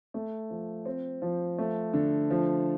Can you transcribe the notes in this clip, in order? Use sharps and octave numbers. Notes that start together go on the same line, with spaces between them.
A3
F3
C4
F3
A3
D3
F3